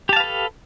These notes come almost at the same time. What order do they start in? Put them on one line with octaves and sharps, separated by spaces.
G4 A5 F5 B4 A4